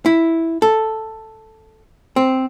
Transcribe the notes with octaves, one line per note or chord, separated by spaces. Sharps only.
E4
A4
C4